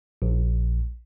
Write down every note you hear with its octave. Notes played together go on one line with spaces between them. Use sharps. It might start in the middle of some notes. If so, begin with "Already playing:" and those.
A#1